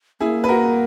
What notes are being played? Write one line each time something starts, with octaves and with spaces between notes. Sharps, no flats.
A#3 E4 G#4
B4
F#4 A#4